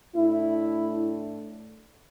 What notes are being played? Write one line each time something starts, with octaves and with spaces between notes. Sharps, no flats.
A2 A3 D4 E4